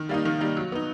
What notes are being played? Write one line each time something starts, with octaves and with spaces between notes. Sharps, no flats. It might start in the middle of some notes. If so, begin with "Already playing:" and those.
Already playing: D#3
G3 A#3 D#4
D#3
G3 A#3 D#4
F#3
B3 D#4